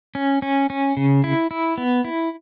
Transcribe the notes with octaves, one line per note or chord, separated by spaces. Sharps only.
C#4
C#4
C#4
C#3
E4
E4
B3
E4